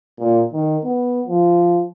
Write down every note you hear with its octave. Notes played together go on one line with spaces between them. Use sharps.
A#2
D#3
B3
F3